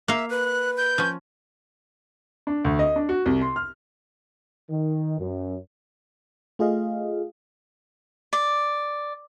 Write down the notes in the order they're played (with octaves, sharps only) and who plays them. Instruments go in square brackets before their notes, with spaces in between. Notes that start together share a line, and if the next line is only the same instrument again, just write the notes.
[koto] A#3 F5 [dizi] E5
[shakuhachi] B4 [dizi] F#6
[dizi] G6
[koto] F3 C#4
[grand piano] D4
D2
D#5
D4
F#4
C2
C6
F6
[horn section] D#3
F#2
[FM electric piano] A3 F4 G#4 D#5 F5
[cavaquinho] D5